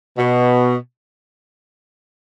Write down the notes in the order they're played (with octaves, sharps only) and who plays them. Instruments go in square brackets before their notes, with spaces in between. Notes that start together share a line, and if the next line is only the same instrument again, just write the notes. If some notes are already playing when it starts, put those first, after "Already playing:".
[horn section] B2